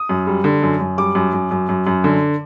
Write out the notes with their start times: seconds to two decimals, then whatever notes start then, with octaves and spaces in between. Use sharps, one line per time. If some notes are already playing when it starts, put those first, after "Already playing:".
Already playing: D#6
0.09 F#2
0.27 G3
0.44 D3
0.63 F#2
0.80 F#2
0.98 G3 D6
1.15 F#2
1.33 F#2
1.51 F#2
1.69 F#2
1.87 F#2
2.04 D3